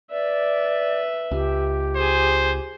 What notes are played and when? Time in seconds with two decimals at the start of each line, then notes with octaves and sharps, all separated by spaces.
0.10 B4 D5 E5
1.31 C#2 G4
1.96 G#4 C5 G#5